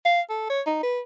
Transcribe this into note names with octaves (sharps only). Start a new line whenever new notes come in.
F5
A4
C#5
D#4
B4